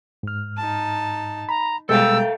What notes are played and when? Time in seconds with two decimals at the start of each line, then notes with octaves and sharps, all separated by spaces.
0.23 G#2 F6
0.57 D#4 A5
1.49 A#5 B5
1.89 B2 G3 G#3 A4 E5 F5 G5 E6